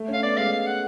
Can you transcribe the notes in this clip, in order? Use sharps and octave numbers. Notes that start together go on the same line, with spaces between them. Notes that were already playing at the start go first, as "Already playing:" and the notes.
Already playing: A3
C#4
F5
B3 D5
G#3 F5
F5
F#5